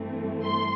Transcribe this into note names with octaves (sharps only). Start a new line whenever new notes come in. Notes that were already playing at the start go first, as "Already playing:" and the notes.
Already playing: G2 E3 A3 C4
C6